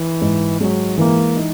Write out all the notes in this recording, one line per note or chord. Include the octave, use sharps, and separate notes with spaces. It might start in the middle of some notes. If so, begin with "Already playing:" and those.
Already playing: E3
G#2
F#3 G#3
E3 A#3
D#4